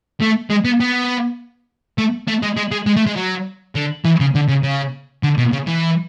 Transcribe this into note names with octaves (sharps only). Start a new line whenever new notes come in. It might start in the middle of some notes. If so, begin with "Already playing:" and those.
A3
G#3
B3
B3
A3
A3
G#3
G#3
G#3
G#3
A3
G#3
F#3
D3
E3
C#3
D3
C#3
C#3
D3
B2
C#3
E3